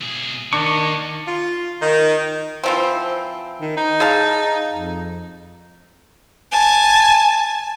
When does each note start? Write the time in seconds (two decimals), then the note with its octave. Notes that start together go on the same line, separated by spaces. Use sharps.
0.01 B1 G#4
0.53 D#3 A#3 D4 D#4 C#6
1.28 F4
1.82 D#3
2.64 E3 F3 C4
3.61 D#3
3.77 D#4
4.00 G#4 F5 A5
4.74 F2
6.52 G#5 A5